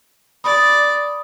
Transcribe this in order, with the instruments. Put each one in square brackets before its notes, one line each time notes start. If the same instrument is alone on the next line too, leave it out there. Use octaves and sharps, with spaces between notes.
[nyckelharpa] D5 [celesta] B5 D#6